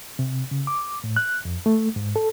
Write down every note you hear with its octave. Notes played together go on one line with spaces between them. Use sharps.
C3
C#3
D6
A2
F#6
F2
A3
G#2
A4